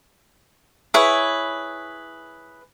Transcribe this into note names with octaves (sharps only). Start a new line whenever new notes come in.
E4 G#4 B4 C#5